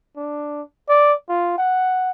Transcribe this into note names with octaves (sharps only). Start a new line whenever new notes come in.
D4
D5
F4
F#5